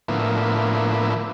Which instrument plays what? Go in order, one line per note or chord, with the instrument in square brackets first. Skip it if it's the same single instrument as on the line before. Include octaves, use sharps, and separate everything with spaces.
[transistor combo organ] A2 D3 F3 A#3 B3 E4